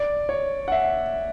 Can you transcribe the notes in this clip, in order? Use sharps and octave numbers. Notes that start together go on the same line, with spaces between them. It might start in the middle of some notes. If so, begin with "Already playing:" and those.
Already playing: D5
C#5
F#5
E5